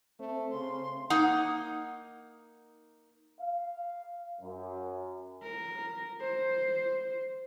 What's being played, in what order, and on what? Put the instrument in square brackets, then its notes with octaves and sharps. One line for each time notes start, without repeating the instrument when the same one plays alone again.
[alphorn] A3 [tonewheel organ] C4
[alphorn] C#3 [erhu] C6
[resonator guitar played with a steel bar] A#3 D#4 F#5
[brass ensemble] F5
F#2
[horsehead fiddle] A#4
C5